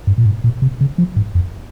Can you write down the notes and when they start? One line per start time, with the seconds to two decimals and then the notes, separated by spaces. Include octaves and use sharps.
0.07 G2
0.18 A#2
0.26 G#2
0.44 A#2
0.62 C3
0.81 C#3
0.98 F3
1.16 G#2
1.35 F2